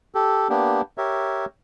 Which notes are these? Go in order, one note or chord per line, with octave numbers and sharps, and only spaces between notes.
G4 A4
A#3 B3 D4 G4
G4 A#4 C#5 E5